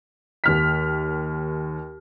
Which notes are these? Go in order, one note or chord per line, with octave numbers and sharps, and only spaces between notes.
D#2 F6 B6